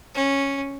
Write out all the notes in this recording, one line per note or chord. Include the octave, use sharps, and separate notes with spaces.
C#4